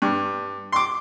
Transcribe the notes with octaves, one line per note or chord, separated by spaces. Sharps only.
G2
C6 D6